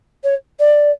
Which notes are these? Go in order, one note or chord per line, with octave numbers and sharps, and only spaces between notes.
C#5
D5